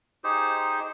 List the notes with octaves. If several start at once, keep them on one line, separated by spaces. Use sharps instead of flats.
D#4 G4 G#4 C5